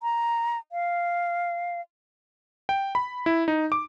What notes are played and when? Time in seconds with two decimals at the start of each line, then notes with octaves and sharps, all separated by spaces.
0.03 A#5
0.72 F5
2.69 G5
2.95 B5
3.26 E4
3.48 D#4
3.72 D6